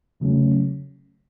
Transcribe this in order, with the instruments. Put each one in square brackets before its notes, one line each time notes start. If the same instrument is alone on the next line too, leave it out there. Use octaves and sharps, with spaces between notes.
[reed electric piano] E2 C#3 F#3 A3 C#4